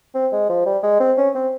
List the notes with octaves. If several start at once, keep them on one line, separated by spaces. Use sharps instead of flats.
C4
G#3
F3
G3
G#3
C4
C#4
C4